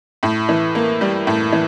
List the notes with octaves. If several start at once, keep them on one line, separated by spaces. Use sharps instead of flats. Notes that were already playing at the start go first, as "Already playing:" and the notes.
A2
E3
A#3
G3
A2
E3